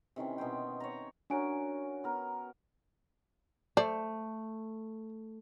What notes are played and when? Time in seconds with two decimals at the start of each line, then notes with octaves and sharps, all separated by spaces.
0.16 C3 D#3 E3 C#4
0.38 B2 D#4 C5 G5
0.80 C#5 A#5
1.30 C#4 D4 F#4 A#4 G#5 D7
2.04 B3 A#4
3.77 A3 C5 D5